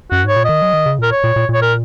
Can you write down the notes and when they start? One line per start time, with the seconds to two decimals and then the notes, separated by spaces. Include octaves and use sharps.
0.11 F#2 F#4
0.24 G#2 C#5
0.36 A#2
0.45 D#3 D#5
0.62 F#3
0.73 D#3
0.86 C#3
0.99 A#2 A#4
1.11 C#5
1.24 A#2
1.36 A#2
1.49 A#2 C#5
1.62 A#4